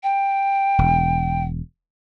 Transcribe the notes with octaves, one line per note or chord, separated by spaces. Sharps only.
G5
E1